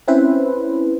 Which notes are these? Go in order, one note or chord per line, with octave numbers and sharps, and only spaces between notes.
C4 C#4 E4 B4 C5